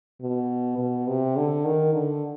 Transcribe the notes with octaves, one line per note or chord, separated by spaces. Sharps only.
B2
B2
C3
D3
D#3
D3